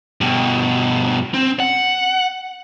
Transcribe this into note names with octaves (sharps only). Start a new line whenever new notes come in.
G2 B2
C4
F#5